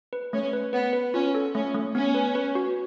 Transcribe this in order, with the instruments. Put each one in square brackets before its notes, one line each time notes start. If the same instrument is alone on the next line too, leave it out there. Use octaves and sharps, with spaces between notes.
[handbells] B4
[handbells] A3 [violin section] C#4
[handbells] B4
[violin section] B3 [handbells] B4
[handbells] B4
[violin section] C#4 [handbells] F4
[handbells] A4
[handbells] A3 [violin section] C#4
[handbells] A3
[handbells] B3 [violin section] C#4
[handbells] B4
B4
F#4